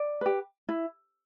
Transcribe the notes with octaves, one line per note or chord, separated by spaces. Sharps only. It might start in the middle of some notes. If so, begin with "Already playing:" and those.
Already playing: D5
G4 B4
E4